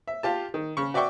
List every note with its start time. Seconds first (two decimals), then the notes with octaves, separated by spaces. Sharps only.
0.08 E5
0.23 F4 G4 A5
0.54 D#3
0.77 C#3 C#6
0.94 F#4 D5 E5 G5 C#6 D6